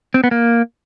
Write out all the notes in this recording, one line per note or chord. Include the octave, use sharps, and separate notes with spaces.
C4
B3
A#3